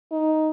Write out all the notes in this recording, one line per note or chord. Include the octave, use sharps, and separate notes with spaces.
D#4